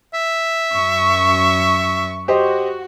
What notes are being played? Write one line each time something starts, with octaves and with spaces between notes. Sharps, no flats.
E5
F#2 C#6
F#4 G4 C5 D#5